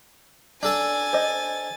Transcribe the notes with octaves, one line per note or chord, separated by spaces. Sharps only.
D4 A4 G#5 A5 A6
C5 D#5